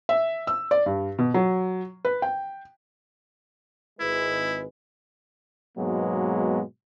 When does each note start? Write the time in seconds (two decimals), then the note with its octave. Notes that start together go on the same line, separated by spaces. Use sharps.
0.09 E5
0.47 E6
0.71 D5
0.86 G2
1.18 B2
1.34 F#3
2.05 B4
2.22 G5
4.00 G#1 G#3 E4 B4
5.78 G#2 B2 F#3 G#3 A#3 B3